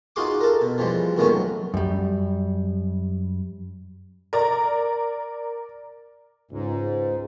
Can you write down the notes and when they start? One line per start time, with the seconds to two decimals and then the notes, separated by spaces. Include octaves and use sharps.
0.16 D#4 F4 F#4 G#4 C6 D6
0.41 A4 A#4
0.61 B2
0.78 E3 F3 G3 G#3
1.16 C#2 A#2 D#3 A3 B3 C#4
1.29 F#3
1.74 F#2 G3
4.33 A#4 D5 A#5
6.51 C#2 G#2